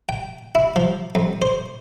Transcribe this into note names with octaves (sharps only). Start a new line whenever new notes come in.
G5
E4
F3
F2
C5